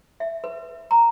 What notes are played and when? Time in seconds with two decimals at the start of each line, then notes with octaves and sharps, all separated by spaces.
0.20 E5
0.44 B4
0.91 A#5